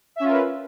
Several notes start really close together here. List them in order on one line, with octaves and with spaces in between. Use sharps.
E5 C#4 F4 A#4 B4